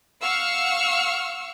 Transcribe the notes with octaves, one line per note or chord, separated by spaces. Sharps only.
F5 F#5 C#6 E6 F6